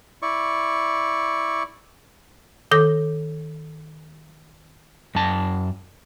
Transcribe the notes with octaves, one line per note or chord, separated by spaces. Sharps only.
E4 D5 C#6
D#3 A4 D6 G6 A#6
F#2 A5